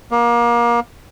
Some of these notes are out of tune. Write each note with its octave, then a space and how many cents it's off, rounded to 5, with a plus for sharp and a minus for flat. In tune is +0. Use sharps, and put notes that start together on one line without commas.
A#3 +30